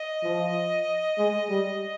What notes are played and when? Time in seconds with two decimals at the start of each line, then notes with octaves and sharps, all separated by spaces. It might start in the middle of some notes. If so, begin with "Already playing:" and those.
Already playing: D#5
0.23 F3
1.18 G#3
1.49 G3